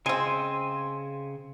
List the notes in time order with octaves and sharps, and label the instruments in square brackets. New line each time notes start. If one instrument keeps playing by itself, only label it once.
[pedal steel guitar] C#3 C5 G#5 [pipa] G#3 C4